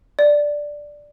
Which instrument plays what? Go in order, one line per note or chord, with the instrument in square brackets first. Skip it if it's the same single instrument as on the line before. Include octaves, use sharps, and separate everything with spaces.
[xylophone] D5